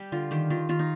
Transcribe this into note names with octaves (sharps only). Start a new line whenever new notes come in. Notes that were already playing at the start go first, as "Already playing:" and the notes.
Already playing: G3 G4
D3 F4
D#3 G4
D#3 F4
D#3 F4
D#4